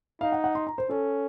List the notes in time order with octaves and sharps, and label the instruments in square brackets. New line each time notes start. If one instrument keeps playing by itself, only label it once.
[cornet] D#4 [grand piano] F5
[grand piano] F#5
F#5
C6
A#5
C5
[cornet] C#4 [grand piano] A4